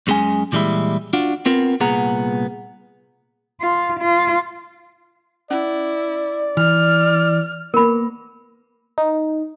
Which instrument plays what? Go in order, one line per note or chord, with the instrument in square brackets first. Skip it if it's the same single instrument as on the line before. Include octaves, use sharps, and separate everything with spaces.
[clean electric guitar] F#2 C3 G#3 C#4 G#5
A#2 E3 G3 G#3 E4
D4 F4 F#4
B3 C4 F4 A#4
C2 A#2 B3 G#4 F#5 A#5
[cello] F4
F4
[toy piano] C#4 [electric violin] E4 [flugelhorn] D5
[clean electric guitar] E3 [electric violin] F6
[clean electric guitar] A#3 B3 [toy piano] A#4 B5
[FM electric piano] D#4